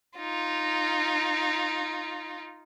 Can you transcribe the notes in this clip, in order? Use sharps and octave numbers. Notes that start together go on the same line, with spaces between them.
D#4 F4